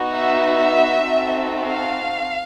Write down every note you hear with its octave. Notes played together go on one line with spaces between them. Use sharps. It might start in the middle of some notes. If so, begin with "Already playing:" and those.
Already playing: B3 D#4 F#4
E5
C4 D#4 F#4 A4
F5